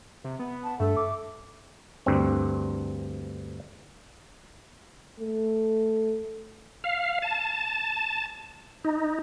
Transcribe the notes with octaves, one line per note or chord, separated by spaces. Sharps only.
C3
B3
A5
G2 A3 A4
D6
D2 G2 C4
A3
F5
A5
D#4